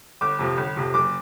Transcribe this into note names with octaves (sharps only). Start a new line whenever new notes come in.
G1 D6
F2 C3 F3
G1
F2 C3 F3
F#1 D6